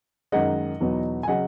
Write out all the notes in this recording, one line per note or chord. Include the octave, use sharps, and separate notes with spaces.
F#2 D#3 G#3 D#4 D#5 F#5
E2 B2 F#3 B3 D#4
G#5
C#3 F#3 D#5 F#5